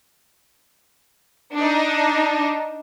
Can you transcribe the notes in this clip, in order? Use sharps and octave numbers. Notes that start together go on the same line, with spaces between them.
D4 D#4